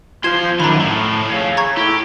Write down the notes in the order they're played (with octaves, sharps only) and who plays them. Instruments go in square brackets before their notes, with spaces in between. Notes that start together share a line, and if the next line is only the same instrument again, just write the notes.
[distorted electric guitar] F2 C6 [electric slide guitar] F4 C5 F5 [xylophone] G#6 C7 E7
[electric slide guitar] F#2 D#3 [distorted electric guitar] D3 D4 [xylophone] A#5 B5
[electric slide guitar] A2 [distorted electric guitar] F3 A3
[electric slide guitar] C#5 F5
[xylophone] A#5 C#6 G#6
[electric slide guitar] E4 A4 [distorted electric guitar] G4